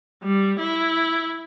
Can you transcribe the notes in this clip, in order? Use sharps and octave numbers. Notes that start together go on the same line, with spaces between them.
G3
E4